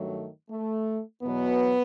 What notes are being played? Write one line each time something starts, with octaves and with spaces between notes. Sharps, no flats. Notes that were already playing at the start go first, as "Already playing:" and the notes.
Already playing: G2 D#3 F#3 A3
A3
E2 B2 F#3 B3